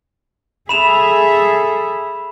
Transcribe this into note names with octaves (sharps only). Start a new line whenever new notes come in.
G#4 A4 E5 B5 E7 F7